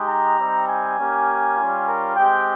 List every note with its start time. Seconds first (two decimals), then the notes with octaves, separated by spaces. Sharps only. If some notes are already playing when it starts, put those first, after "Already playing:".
Already playing: G#3 D#4 G4
0.09 A#5
0.39 G3 C4 D#4
0.68 G#5
0.98 A#3 C#4 G4
1.57 G3 C#4 F4
1.87 A#4
2.16 G#3 C4 G4 G5